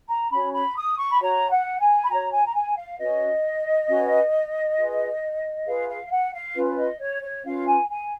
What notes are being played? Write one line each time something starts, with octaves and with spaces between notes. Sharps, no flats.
A#5
C#4 F#4 C#5 B5
B5
D#6
C#6
B5
F#4 C#5 A#5
F#5
G#5
B5
F#4 C#5 A#5
G#5
A#5
G#5
F5
C#4 F#4 B4 D#5
C#4 F#4 B4
F4 G#4 B4
F4 G#4 B4 F5
F5
F5
F#5
F5
C#4 F4 B4
D#5
C#5
C#5
C#4 F4 B4 F5
G#5
G#5